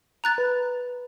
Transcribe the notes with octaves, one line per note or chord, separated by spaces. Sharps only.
A#5 F#6 A6
B4